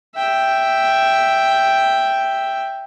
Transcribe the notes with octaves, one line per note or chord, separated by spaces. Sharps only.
E5 G5